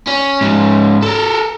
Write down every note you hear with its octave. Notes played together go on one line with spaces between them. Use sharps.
C#4
G#2 C#4
A4 A#4